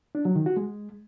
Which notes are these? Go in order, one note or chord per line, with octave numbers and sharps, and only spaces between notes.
D4
F#3
D#3
F#4
G#3